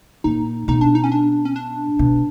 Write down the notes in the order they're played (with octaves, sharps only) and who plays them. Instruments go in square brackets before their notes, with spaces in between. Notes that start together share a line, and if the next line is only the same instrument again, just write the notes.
[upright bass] A#2 [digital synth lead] D#4
[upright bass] B2 [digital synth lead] D#4
[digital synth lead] D4
D#4
C#4
D4
C#4
D4
[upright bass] B2